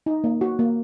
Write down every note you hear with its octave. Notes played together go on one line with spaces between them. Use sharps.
D#4
A#3
F#4
A#3